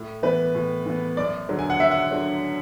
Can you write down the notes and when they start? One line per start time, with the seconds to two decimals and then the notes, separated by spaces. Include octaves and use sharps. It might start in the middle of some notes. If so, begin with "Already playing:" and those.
Already playing: A2
0.23 E3 B3 B4
0.55 A2
0.86 E3 B3
1.17 F#2 D5
1.49 D3 F#3
1.59 G#5
1.70 F#5
1.80 F#2 E5
1.91 F#5
2.11 D3 F#3